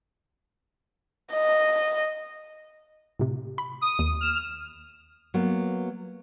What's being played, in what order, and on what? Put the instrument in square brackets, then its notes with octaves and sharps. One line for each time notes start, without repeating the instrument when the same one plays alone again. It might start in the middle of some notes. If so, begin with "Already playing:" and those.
[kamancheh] D#5
[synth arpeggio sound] A2 C3
B5
[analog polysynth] D#6
[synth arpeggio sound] D#2 D#7
[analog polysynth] F6 E7
[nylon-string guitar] F#3 A#3 B3